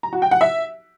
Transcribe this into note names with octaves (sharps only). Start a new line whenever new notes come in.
A#5
F#4
G5
F#5
E5